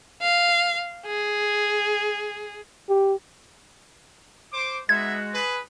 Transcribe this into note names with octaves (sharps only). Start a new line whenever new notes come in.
F5
G#4
G4
C5 D6
G#3 B3 D#4 F#4 E5 G#6
G#4 B4